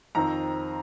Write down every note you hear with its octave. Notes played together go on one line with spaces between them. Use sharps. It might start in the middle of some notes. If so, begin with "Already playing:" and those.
F2 D#3 C4 A#5